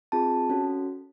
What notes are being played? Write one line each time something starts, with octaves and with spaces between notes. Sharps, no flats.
C4 F4 G#4 A5
C#4 F#4 A4